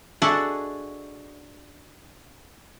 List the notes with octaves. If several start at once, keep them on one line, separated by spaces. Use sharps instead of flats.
D4 F#4 G#4 A4 D#5 E5